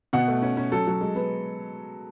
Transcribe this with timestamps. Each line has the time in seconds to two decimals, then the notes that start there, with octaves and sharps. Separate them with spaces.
0.13 B2 F#5
0.28 A3
0.42 C#4
0.57 C#4
0.72 F#3 A4
0.87 F#3
1.01 G#3
1.15 B3